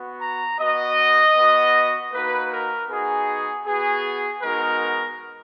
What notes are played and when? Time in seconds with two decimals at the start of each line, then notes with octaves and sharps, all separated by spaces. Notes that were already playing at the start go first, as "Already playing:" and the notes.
Already playing: B3 F#4
0.21 A#5
0.59 B3 F#4 D#5
1.36 B3 F#4
2.12 A#3 D#4 F#4 B4
2.51 A#4
2.89 B3 D#4 F#4 G#4
3.65 B3 F#4 G#4
4.42 G#3 B3 D#4 F#4 A#4